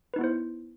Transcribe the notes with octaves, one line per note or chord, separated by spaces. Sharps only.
B3 D#4 E4 B4 C5